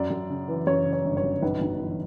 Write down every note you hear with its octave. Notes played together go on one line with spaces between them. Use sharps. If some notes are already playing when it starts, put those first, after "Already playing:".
Already playing: F#2 D5
F#2
C#3
E3
F#2 C#5
C#3
C#5
G1
C#5
F#2
B1 B4
B1
E3